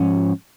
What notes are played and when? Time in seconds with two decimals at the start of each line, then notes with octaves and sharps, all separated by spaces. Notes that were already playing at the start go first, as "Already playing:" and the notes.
Already playing: G#2 F3 C#4